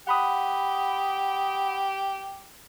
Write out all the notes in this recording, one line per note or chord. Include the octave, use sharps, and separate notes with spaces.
G4 F#5 B5 D#6